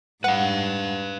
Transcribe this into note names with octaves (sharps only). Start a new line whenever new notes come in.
G#2 G3 B4 F5 F#5